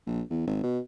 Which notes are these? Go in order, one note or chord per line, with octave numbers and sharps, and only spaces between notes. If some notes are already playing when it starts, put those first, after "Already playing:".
A#1
E2
G#1
B2